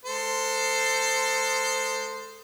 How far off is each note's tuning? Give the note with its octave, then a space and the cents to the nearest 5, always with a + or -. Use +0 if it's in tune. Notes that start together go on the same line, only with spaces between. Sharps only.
G#3 +0 A4 +20 C5 -5